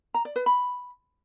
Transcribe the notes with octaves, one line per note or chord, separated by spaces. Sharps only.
A#5
D5
B4
B5